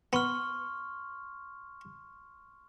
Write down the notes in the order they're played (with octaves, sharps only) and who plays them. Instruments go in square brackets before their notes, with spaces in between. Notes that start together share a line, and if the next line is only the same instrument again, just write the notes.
[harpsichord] B3 [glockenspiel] C6 C#6 F6